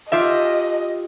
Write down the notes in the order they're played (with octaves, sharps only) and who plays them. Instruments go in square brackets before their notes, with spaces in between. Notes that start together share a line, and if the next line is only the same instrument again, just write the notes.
[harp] F4 G4 E5 [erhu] D#5